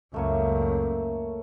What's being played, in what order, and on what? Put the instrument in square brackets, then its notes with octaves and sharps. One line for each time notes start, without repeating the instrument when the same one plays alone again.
[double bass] C#2 F#2 [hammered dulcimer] A3 A#3 C#5